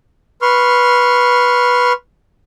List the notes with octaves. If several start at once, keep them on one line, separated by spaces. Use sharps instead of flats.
B4 C6 C#6 F6